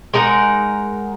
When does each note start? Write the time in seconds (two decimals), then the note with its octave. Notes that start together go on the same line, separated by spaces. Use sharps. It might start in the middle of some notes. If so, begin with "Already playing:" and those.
0.14 G#3 D#4 A#4 F#5